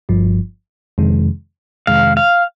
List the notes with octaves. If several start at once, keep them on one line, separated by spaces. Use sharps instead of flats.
G1 G2 F3
F2 C3 D#3 G#3
F2 C3 D#3 G#3 F5
F5